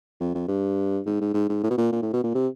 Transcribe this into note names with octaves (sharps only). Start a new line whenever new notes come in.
F2
F2
G2
G#2
G#2
G#2
G#2
A2
B2
A#2
A#2
A2
B2
A#2
C3